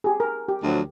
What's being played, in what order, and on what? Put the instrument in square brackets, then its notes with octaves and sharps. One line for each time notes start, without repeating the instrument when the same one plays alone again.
[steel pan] G4 G#4
A#4
G4
[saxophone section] D2 F3 F#3